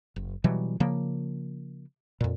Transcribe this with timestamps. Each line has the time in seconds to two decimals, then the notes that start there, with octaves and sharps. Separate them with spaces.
0.16 F#1
0.44 B2 E3 F#3 G3
0.80 C#3 F3 A#3
2.21 F2 A#2